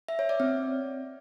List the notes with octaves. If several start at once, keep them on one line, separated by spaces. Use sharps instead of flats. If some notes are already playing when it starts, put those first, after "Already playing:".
E5
C#5
D5
C4